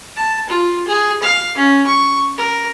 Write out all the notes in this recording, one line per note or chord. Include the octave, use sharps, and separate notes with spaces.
A5
F4
G#4
F5
C#4
C#6
A#4